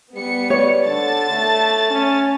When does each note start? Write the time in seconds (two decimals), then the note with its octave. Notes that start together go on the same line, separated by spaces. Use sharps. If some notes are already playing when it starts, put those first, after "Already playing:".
0.15 G3 B3 C#7
0.50 C#5 D5
0.87 D3 A5 A6
1.31 A3
1.90 C#4